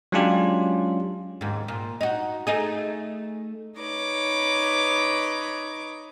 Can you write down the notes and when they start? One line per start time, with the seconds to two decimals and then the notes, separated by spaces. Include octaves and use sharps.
0.12 F#3 G#3 C#4 D4 F4 G4
1.41 D#2 G#2
1.68 A#2
2.01 D#4 F#4
2.47 A3 D#4 G#4
3.79 D#4 B4 C#5 D6